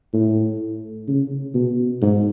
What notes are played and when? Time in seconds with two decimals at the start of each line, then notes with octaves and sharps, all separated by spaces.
0.13 A2
1.07 C#3
1.54 B2
2.02 G#2